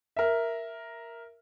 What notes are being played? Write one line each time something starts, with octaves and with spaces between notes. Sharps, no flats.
A#4 E5